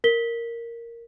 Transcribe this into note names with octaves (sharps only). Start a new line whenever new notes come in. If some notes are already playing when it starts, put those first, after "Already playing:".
A#4 B6 G7